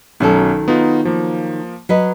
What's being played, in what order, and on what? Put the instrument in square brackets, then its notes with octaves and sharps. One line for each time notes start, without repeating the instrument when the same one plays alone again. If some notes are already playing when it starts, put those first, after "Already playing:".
[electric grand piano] B1 C#4 [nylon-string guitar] D#3 F#3 A4
[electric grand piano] B3 D#4 F4
F3 A#3
[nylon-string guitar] F#3 B4 D#5